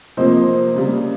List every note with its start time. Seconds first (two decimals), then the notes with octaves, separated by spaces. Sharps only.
0.17 C3 F3 A#3 C5 D#5
0.75 C#3 G3 A#3